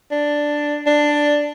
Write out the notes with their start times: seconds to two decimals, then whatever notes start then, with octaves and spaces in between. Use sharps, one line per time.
0.11 D4
0.87 D4